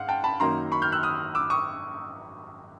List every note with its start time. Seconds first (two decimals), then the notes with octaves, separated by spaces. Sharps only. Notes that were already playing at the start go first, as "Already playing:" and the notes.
Already playing: G#2 F5 F#5
0.08 G5 A5
0.24 A5 B5
0.40 F#2 D#3 F#3 A#3 D#4 A#5 C6
0.72 B5 C#6
0.82 F6 G6
0.92 E6 F#6
1.03 D#6 F6
1.35 D6 E6
1.50 C#6 D#6